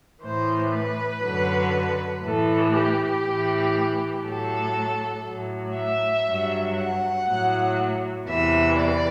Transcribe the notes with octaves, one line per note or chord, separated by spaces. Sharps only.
A2 E3 C5
B4
F#2 D3 F#3
A2 E3 A4
G4
A2 E3
A2 F#3 A4
A2 F#3
E5
G2 F#3
F#5
A2 F#3
E2 C3 E3 E5
D5